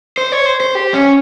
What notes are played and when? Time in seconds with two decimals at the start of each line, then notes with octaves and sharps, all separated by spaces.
0.18 C5
0.32 C#5
0.46 C5
0.60 C5
0.75 G4
0.94 C#4